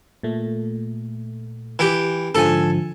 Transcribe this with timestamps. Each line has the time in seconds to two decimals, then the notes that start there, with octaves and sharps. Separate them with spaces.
0.23 A#2 A3
1.79 E3 G4
2.35 G#2 D3 F3 A4 G#5